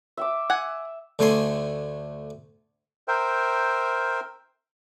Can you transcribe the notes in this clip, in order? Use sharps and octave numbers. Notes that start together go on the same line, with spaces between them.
E5 G5 D6
F#5 G#5
D2 D3 A3 D4 G#5 C6
A#4 C5 E5 G5